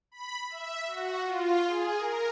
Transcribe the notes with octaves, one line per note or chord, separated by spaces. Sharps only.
B5
E5
F#4
F4
G#4
A#4